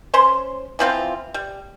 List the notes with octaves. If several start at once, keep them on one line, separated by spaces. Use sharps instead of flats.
C#4 C5 C6
E3 F3 C4 F4
G3